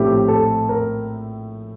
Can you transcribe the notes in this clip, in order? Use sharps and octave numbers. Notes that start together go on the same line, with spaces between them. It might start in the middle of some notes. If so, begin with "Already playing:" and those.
Already playing: A#1 A2 A3 C4 G4
A4
A#4